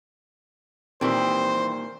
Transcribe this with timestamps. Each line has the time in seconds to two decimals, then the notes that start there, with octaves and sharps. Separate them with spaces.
1.01 A#2 D#3 E3 G3 C4 C5